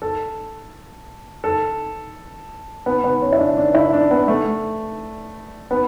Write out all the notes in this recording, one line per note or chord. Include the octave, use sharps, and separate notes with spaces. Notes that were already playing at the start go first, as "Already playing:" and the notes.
A4
A4
B3
B3
C#4
E4
D4
D4
E4
D4
B3
A3
B3